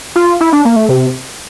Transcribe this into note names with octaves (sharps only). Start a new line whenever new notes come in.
F4
E4
D4
A#3
A3
C3